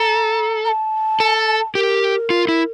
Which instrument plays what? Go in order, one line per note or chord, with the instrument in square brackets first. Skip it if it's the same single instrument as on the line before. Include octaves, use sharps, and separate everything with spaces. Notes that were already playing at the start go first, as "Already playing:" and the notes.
Already playing: [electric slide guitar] A4 [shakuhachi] A#5
[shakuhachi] A#5
A5
[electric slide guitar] A4
[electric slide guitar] G4 [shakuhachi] A#4
[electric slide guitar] F4
E4